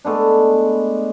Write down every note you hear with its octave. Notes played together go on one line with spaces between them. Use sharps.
G#3 A3 B3 D4